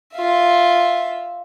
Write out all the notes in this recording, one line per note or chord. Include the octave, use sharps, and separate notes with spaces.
F4 E5